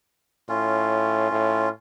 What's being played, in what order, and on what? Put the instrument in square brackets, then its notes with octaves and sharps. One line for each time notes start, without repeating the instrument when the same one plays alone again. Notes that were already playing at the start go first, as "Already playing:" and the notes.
[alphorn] A2 [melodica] C#4 F4
[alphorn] A2